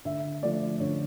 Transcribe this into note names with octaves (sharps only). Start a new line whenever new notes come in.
D3 E5
F3 A3 D5
D3 C#5